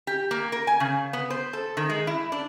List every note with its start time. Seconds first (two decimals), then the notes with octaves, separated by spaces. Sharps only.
0.07 G4
0.31 A#3
0.52 A#4
0.67 G#5
0.80 C#3
1.13 B3
1.30 C5
1.53 A4
1.77 D#3
1.90 G#3
2.07 E4
2.32 D4